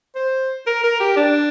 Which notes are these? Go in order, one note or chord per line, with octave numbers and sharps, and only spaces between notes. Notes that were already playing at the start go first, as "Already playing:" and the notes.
C5
A#4
A#4
G4
D4